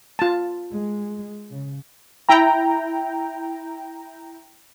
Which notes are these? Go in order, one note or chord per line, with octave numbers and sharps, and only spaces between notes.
F4 A5
G#3
C#3
E4 G5 A#5